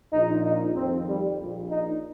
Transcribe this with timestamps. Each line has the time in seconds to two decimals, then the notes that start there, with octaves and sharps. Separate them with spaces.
0.11 A#1 A#2 D#4
0.43 D#4
0.74 F2 D#3 C4
1.07 G3
1.37 A#1 A#2
1.69 D#4